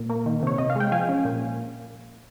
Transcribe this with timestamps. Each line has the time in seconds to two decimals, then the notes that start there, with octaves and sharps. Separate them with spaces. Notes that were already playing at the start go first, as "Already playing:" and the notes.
Already playing: A#2
0.10 A#3
0.26 D#3
0.43 C3 C#5
0.58 C3 D#5
0.70 F5
0.76 G#3 G5
0.92 F3 F5 G#5
1.09 C#4
1.25 A#2